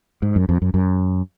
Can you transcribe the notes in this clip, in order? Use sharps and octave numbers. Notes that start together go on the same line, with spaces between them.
G#2
F#2
F2
F#2
F#2